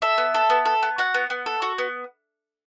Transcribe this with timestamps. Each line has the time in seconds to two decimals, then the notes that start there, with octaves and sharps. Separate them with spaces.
0.02 A4 E5
0.18 B3
0.34 A4
0.50 B3
0.65 A4
0.83 B3
0.98 F#4 F#5
1.14 B3
1.30 B3
1.46 A4
1.62 F#4
1.78 B3